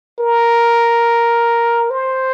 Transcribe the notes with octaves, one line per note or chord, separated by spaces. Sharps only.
A#4
C5